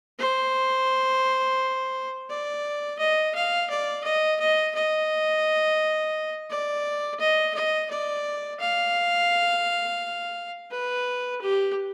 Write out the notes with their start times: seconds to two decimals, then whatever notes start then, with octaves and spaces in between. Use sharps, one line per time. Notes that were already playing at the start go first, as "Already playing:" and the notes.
0.19 C5
2.30 D5
2.99 D#5
3.35 F5
3.70 D5
4.04 D#5
4.40 D#5
4.75 D#5
6.50 D5
7.20 D#5
7.54 D#5
7.90 D5
8.60 F5
10.71 B4
11.41 G4